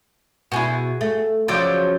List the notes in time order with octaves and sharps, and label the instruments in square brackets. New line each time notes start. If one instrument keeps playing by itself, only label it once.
[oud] B2 E4 [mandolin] F#4 G#4
[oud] A3
[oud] C#3 F3 F#3 [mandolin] D5 E6 G6